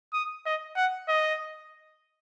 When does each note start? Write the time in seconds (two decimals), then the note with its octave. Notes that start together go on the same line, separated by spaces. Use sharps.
0.13 D#6
0.46 D#5
0.77 F#5
1.09 D#5